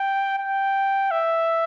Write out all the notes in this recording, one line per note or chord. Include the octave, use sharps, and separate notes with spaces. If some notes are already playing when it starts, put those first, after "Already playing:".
Already playing: G5
G5
E5